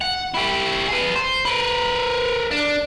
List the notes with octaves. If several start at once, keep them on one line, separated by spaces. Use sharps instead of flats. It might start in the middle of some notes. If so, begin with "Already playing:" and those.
F#5
E4 G4
G#4 B4
C5
A#4 B4
D4